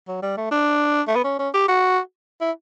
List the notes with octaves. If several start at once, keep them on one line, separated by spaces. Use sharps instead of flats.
F#3
G3
A3
D4
A3
B3
C#4
C#4
G4
F#4
E4